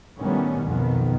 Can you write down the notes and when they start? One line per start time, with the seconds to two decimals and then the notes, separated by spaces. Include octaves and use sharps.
0.18 A2 D#3 G3 B3 C#4
0.63 B1 F2 D#3 B3